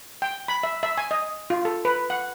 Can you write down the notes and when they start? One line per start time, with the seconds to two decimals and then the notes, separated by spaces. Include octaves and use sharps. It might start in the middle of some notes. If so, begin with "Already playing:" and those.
0.22 G5
0.48 B5
0.63 E5
0.83 E5
0.98 G#5
1.11 D#5
1.50 F4
1.65 A4
1.85 B4
2.10 F#5